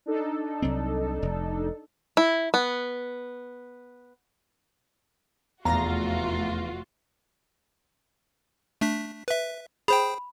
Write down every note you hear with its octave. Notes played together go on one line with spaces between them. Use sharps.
D4 D#4 A4
C2 F#3 C4
F1
E4
B3
F1 E2 A3 F4 F#4 F5 A#5 A#6
A3 D4 B6
B4 E5
G#4 C5 G5 B5